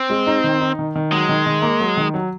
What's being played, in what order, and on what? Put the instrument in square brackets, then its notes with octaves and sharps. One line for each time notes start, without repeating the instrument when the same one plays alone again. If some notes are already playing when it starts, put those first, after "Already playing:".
Already playing: [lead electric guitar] C4
[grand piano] G#3
D#4
D#3
D#4
D#3
D#3
[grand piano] F#3 [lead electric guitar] G#3
[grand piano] D#3
D#3
A#3
F#3
D#3
F#3